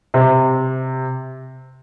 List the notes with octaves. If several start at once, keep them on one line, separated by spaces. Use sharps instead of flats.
C3